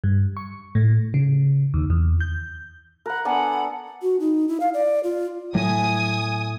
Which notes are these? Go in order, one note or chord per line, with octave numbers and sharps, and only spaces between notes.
G2
C#6
A2
C#3
D#2
E2
G6
A#4 F#5 B5 F#6
B3 D4 A4 F#5 G#5 B5
F#4
D#4
E4
F5
D5
F4
A2 F#3 G#5 D#6